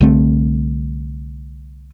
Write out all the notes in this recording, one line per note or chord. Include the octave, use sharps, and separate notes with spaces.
C2 D3 A3 C4